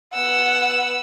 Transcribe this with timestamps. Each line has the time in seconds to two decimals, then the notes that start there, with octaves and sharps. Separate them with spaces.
0.14 B3 F#5 E6